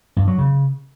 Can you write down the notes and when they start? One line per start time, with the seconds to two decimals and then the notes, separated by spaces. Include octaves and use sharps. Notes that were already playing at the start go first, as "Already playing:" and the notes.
0.16 G2
0.27 F#3
0.38 C#3